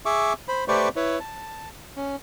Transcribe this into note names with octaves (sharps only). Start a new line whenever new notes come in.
G#4 E5 C#6 D6
C5 B5
A3 G4 B4 C5 D5 C#6
E4 B4 C#5
A5
C#4